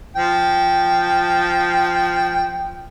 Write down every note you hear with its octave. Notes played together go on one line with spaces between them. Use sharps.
F3 G5